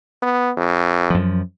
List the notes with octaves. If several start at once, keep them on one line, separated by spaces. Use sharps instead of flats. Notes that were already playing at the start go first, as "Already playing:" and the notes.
B3
F2
F#2 F3